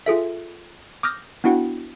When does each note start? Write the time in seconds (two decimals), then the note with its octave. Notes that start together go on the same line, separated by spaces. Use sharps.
0.06 F4 G#4 A4 E5
1.03 D6 D#6 F6 G6 A#6
1.44 B3 D4 E4 F#4 F#5 G5